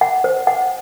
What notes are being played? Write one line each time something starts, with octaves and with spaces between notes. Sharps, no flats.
F#5
C5
F#5